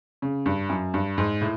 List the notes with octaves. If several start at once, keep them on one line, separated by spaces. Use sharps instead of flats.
C#3
G2
F#2
G2
G#2
A2